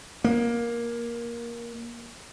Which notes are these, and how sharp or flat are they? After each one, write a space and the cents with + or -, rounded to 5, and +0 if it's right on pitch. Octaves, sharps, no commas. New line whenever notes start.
A#3 +15